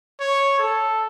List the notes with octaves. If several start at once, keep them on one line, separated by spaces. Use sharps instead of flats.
C#5
A4